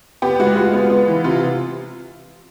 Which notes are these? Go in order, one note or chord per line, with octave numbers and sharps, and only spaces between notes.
B3 G4
G#3 F#4
G#3 F4
B3
B3
E3
C3 F4